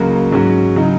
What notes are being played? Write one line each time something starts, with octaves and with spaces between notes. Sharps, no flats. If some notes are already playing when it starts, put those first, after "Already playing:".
Already playing: C#2 C#3 F#3 A#3 F#4
G#2 F#3 C#4 F#4
C#3 F#3 D#4